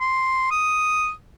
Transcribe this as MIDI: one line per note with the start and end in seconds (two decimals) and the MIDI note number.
0.01 0.47 84
0.51 1.11 87